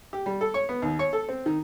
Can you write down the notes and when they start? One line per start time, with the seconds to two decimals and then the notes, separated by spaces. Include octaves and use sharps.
0.13 G4
0.26 G3
0.41 A4
0.54 C#5
0.69 B3
0.82 D#2
0.99 C#5
1.13 A4
1.29 C4
1.46 D#3